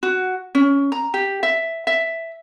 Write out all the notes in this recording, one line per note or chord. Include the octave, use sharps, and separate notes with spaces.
F#4
C#4
A#5
G4
E5
E5